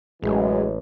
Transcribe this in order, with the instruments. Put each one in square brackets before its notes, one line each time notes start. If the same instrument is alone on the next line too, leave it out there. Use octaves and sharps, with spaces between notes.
[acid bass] A1 [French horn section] F#2 E3 G#3